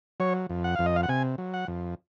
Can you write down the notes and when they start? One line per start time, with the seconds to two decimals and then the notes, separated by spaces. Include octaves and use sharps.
0.20 F#3 C#5
0.50 F2
0.64 F#5
0.75 F2 F5
0.86 D#5
0.96 F5
1.03 F#5
1.09 C3 G#5
1.38 F#3
1.54 F#5
1.68 F2